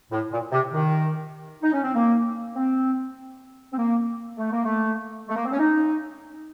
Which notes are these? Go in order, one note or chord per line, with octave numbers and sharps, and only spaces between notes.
A2
A#2
C3
D#3
D#4
C#4
C4
A#3
C4
C4
A#3
A3
A#3
A3
A3
A#3
C4
C#4
D#4